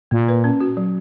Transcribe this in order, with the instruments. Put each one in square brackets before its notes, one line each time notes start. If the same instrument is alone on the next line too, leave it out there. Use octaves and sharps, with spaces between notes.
[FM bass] A#2 [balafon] A#3
[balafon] B4
C#4
F#4
F#3